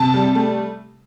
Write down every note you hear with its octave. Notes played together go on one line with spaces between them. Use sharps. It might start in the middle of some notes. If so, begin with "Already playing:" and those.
Already playing: C3 A5
G3
A3